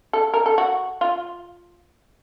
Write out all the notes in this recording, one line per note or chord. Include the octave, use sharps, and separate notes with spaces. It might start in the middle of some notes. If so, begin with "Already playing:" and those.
A4
A#4
A4
F#4
F4